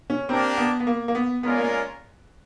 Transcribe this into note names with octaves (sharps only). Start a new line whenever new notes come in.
C#4
A#3 C4 D4 G4 A#4
B3
B3
A#3
A#3
B3
G#3 B3 C#4 F4 A#4 D5
A#3